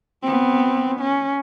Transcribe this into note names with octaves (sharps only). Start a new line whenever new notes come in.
B3 C4
C#4